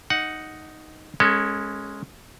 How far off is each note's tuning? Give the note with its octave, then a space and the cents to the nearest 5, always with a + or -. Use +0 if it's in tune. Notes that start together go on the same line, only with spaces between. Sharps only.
D#4 +0 F#5 +0
G#3 +0 C#4 -15 A4 +35